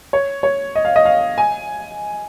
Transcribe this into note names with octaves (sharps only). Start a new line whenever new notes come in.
C#5
C#5
D#5
F5
D#5
F5
G#5